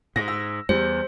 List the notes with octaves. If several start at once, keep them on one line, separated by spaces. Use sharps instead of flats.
G#2 A#6
E6
E2 G3 C5